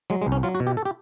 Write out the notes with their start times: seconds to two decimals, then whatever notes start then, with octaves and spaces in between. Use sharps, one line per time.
0.10 F#3 G#3
0.22 G#3
0.27 C2
0.32 C#4
0.43 F#3 F4
0.55 F#4
0.60 B2
0.67 G4
0.77 A4
0.85 G4